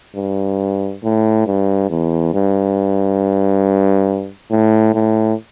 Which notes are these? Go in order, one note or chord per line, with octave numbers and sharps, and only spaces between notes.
G2
A2
G2
E2
G2
A2
A2